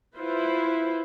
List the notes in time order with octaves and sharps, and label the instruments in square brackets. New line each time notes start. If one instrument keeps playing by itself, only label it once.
[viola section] E4 F4 B4 C5